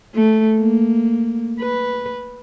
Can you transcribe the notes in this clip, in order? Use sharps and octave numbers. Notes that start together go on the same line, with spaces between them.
A3
A#3
B4